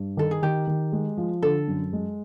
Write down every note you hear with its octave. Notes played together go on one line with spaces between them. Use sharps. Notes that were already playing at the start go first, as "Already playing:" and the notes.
Already playing: G2
D#3 A4
G#4
D#3 G4
D#3
G#3
F3
D3 A4
F#2
G#3